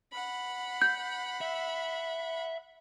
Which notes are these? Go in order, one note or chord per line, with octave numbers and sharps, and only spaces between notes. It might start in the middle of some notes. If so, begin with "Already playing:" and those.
F#5 B5
G6
E5